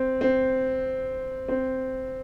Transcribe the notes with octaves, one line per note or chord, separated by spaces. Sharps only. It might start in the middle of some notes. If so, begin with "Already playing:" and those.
Already playing: C4
C4
C4